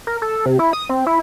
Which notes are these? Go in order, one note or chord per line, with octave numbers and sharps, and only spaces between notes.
A#4
A4
C3
E4
D#6
C4
E4